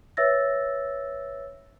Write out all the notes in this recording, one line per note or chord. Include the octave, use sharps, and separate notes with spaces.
B4 C#5 E5 E6 A6 A#6